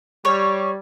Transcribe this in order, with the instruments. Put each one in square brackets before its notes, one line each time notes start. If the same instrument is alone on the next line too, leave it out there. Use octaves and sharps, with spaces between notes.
[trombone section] G3 [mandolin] C#5